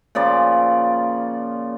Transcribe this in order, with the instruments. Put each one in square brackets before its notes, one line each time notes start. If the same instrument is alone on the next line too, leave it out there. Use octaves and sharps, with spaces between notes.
[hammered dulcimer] A#2 C#3 F3 D5